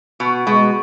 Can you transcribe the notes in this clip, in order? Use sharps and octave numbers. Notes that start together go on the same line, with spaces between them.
B2
B2 G#3